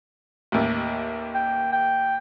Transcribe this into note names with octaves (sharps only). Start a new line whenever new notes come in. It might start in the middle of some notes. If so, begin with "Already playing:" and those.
A1 D#2
G5
G5